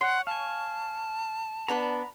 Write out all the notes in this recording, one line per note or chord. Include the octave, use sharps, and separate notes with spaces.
C#5 F#5 C6
F5 G#5 A5
B3 D4 B4 A#5 B5